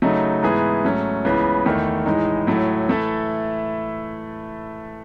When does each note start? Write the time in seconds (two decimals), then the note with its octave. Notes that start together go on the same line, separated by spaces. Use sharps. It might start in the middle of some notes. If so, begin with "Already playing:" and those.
0.02 C#3 F#3 A3 D#4
0.43 G#2 E3 B3 E4 G#4
0.84 G#2 F#3 A3 C#4
1.25 C#2 C#3 E3 B3
1.66 E2 D#3 A3
2.06 A2 E3 G#3 D#4
2.47 A2 F#3 A3
2.88 E3 A3 E4 A4